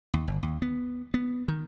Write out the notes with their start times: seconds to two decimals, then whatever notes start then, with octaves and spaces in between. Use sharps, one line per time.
0.14 D#2
0.28 G1
0.43 D#2
0.62 B3
1.14 B3
1.48 D#3